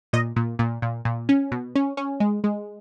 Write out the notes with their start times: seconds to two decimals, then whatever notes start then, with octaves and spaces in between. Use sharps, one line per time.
0.13 A#2 D#5
0.36 A#2
0.59 A#2
0.82 A#2
1.05 A#2
1.29 C#4
1.52 B2
1.75 C#4
1.97 C#4
2.20 G#3
2.44 G#3